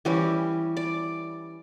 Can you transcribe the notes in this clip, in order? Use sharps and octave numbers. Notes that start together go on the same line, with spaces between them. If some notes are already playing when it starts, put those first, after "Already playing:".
E3 G3 C#4 E4
D5